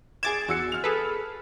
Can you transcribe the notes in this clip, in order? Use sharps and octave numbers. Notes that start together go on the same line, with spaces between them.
G#4 D6 G#6 A6 E7
E2 F#4 E6 C#7
F6 F7
G#4 A4 B4